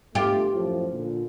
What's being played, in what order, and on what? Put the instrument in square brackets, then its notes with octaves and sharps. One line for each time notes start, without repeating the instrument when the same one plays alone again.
[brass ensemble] G1 A3 [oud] F4 G4
[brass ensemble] F#2 A2 F3
A#2 D3